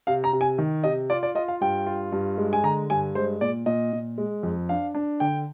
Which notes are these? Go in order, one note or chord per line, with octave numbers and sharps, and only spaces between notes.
C3 F5
A#5
C3
G#5
D#3
C3 D#5
F4 D5
D5
F4 D#5
F5
G2 G5
F4
G2
G#3
G#5
D3 A#5
G2 G#5
G#3 C5
A#2 D5
A#2 D#5
A#2
G#3
F2
D4 F5
D4
D3 G5